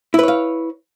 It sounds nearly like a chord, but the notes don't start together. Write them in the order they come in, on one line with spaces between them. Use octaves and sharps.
E4 B4 C#5 F5